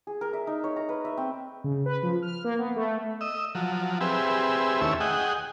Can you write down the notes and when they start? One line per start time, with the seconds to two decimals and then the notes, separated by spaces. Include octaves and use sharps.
0.07 G#4
0.21 A#4
0.33 E5
0.47 D#4
0.64 C#5
0.76 A#5
0.89 B4
1.05 E5
1.17 C4
1.64 C#3
1.86 B4
2.03 F3
2.22 F6
2.44 A#3
2.58 B3
2.76 A3
3.21 D#5 E6
3.55 F3 F#3
4.01 C4 G4 G#4 B4 E5
4.81 D#2 A3 C#4 E4 E5
5.00 G#4 D#5 F#5 G5